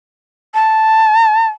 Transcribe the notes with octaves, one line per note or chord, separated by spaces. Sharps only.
A5